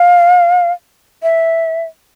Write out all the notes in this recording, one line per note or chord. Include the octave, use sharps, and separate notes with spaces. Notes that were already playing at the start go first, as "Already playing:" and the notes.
Already playing: F5
E5